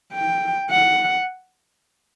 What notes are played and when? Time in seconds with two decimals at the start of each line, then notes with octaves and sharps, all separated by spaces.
0.13 G5
0.71 F#5